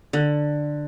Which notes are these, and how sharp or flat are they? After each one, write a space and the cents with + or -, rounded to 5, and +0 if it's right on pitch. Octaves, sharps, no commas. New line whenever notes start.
D3 +10